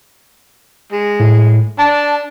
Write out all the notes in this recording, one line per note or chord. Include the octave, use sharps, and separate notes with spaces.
G#3
A2
D4 A5